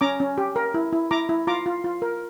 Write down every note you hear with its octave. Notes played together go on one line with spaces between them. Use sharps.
C#4 A#5 D6
C#4
G4
A#4
E4
E4
E4 A#5 D6
E4
F4 A#5 D6
F4
F4
A#4